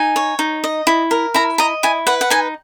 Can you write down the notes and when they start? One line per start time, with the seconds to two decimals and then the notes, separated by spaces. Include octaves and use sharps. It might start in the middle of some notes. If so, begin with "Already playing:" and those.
Already playing: D#4 G#5
0.16 C#5
0.39 D#4
0.64 D#5
0.87 E4
1.11 A#4
1.34 E4 A#5
1.58 D#5 A#5
1.83 E4 G#5
2.07 B4 F#5
2.21 F#5
2.30 D#4 G#5